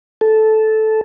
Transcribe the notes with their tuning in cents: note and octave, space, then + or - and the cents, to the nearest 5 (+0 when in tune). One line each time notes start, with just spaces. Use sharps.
A4 -10